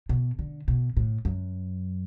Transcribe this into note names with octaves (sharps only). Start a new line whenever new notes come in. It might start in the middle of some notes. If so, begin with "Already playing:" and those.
B2
D3
B2
A2
F#2